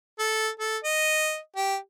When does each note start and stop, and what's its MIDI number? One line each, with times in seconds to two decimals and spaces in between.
0.19 0.49 69
0.60 0.77 69
0.84 1.38 75
1.56 1.76 67